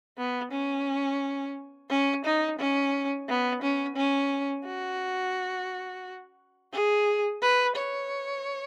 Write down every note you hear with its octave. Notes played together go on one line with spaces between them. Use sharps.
B3
C#4
C#4
D#4
C#4
B3
C#4
C#4
F#4
G#4
B4
C#5